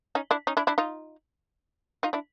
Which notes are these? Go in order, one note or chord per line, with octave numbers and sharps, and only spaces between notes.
C#4 D#4
D4 E4
C#4 D#4
D4 E4
D4 E4
D#4 F4
D#4 F4
D4 E4